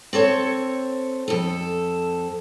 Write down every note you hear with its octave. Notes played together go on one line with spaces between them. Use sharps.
C4 A4 C#5
F2 A4